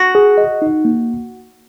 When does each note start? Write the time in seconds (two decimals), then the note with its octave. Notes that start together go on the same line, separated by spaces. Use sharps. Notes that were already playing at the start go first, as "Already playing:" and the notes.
Already playing: F#4
0.15 G#4
0.38 D#5
0.62 D#4
0.85 A#3